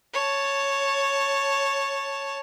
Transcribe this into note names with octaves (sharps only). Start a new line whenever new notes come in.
C#5 A5